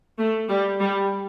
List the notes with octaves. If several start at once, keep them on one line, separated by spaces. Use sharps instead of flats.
A3
G3
G3